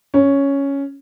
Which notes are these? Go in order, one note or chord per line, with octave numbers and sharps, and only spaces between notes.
C#4